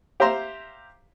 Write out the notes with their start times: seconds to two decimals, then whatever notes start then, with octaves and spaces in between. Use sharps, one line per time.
0.20 G4 C5 E5 F5 A#5 C6